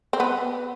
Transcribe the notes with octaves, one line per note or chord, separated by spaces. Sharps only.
C4
B3